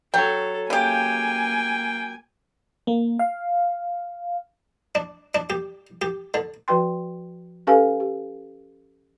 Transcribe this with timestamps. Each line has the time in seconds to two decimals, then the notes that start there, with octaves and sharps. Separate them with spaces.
0.14 F#3 A4 C#5 G5
0.70 C#3 A#3 G4 G5 G#5
2.87 A#3
3.19 F5
4.95 D4
5.35 D4
5.50 G4
6.02 G4
6.34 D3
6.68 F3 F#4 B4 G5 C6
7.67 C#4 G4 A4 B4 F5 G#5
8.00 G4